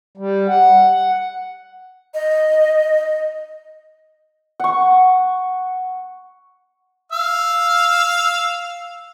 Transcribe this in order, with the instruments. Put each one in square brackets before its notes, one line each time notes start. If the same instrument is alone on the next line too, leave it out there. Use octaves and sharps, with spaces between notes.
[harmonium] G3
F#5
[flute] D#5
[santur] F#5 C#6
[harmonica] F5 E6